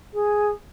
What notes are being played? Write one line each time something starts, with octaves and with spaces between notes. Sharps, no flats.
G#4